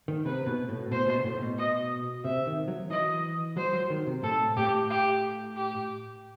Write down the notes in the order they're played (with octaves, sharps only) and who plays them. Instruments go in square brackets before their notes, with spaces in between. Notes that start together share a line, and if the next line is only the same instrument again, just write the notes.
[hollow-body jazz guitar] D#3
[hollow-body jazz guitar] C3 [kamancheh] B4
[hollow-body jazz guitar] B2
A2
[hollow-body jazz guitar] B2 [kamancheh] C5
[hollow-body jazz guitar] B2
B2
A2
B2
[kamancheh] D#5
[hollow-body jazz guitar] C3 [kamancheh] E5
[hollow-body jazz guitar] D#3
F#3
[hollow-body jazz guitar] E3 [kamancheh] D#5
[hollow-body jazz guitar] F#3 [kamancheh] C5
[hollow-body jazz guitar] F#3
D#3
C3
[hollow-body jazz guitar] A2 [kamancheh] A4
[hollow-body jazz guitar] A2 [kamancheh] G4
[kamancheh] G4
G4